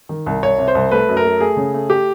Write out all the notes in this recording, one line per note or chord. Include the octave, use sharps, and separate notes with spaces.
D#3
C2
C2 C#5
C3
C5
C2
A3 B4
F#2
A#4
A3
A3 G#4
C#3
A3
G4